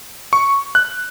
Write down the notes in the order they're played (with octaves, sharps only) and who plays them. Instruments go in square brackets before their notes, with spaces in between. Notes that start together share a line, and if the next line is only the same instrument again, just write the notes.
[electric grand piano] C#6
F#6